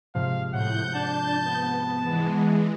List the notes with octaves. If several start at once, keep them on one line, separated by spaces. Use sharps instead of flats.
G#2 C3 F3 F5
A2 F#5 G6
D4 A5
B3
E3 G#3